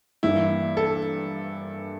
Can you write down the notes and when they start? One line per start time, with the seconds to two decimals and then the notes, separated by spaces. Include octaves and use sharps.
0.23 G2 E3 A#3 E4
0.77 A4